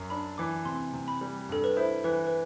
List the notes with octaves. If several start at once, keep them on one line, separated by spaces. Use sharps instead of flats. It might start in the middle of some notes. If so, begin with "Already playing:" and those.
Already playing: F#2
D4 B5
E3 D6
C3 C6
C3
B5
G3
G2 A4
B4
E4 C5
E3 B4
B4